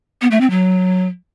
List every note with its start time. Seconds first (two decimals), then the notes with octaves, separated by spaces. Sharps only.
0.21 B3
0.31 A3
0.41 C4
0.50 F#3